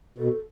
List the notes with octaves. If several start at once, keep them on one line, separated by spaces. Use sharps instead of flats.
B2 A4